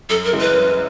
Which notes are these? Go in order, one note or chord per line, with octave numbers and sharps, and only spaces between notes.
F#2 A4
A#4
C#3 E3 G#3
B4
F#2